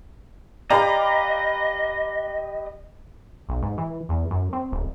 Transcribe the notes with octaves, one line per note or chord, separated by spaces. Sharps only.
G4 B4 D5 D#5 F5 A#5
B1
G#2
E3
E2
F#2
C4
D1